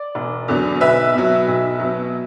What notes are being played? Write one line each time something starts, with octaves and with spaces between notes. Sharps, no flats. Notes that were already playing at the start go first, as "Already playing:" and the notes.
Already playing: D5
E1
E2 D3 F#3
B1 B4 E5
B2 F#3
B1
B2 F#3